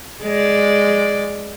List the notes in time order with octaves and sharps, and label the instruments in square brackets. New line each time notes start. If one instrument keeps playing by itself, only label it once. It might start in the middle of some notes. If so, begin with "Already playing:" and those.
[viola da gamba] G#3 D5